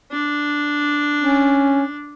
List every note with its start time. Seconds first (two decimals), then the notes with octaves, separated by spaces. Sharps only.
0.11 D4
1.22 C#4